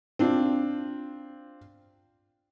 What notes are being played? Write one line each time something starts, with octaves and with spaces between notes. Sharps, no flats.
C4 D4 F4